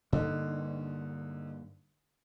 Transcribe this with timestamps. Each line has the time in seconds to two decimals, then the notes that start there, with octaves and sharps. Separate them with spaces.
0.13 G2 D3 A#3 D#4